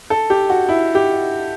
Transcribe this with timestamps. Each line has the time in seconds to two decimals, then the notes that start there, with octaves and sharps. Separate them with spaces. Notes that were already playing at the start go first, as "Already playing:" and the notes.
0.10 A4
0.30 G4
0.50 F#4
0.69 E4
0.95 G4